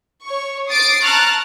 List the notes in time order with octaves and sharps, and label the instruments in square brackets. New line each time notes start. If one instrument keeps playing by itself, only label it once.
[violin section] C#5 C#6
D6 D#6 A6 C7 D7
A5 A#5 C#6 F6 F#6 A6